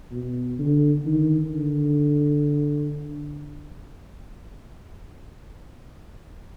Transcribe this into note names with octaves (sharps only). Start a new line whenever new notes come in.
B2
D3
D#3
D3